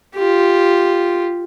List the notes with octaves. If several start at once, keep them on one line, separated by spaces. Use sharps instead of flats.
F4 G4